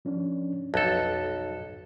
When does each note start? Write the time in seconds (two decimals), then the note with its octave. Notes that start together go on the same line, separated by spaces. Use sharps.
0.05 F3 C#4 D4
0.74 B1 F2 A4 A5 F#6